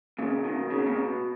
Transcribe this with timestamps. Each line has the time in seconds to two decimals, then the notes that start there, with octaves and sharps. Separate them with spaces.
0.19 A#2 C#3
0.44 B2 D#3
0.70 C#3
0.78 B2
0.86 A#2 C#3
0.96 B2